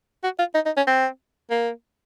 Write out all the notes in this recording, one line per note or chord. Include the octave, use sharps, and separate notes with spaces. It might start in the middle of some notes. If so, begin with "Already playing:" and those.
F#4
F4
D#4
D#4
C#4
C4
A#3